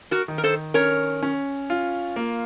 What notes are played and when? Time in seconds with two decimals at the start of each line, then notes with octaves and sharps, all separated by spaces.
0.11 F#4 A#4
0.28 D#3
0.38 A#4
0.44 A4 C5
0.74 C#4 A#4 C#5
1.23 C#4
1.70 F4
2.16 A#3